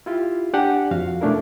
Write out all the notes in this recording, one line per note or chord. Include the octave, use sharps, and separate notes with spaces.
E4 F4 G4
D4 G4 F#5 G#5
F2 F#4 F5
B2 A3 C#4 D4 E4 A#4